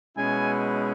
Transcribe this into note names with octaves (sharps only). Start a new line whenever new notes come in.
B2 G#3 C#4 E4 G#5